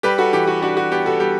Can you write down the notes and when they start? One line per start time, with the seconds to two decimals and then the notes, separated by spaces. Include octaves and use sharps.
0.03 G3 G4 B4
0.18 F#4 A4
0.33 E3 G4
0.47 F#4
0.62 D4 F#4
0.77 F#4
0.91 B3 G4
1.06 F#4 A4
1.20 G3 G4